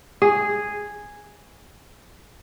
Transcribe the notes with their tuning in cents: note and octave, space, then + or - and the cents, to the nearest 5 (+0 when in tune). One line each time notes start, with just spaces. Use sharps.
G#4 -5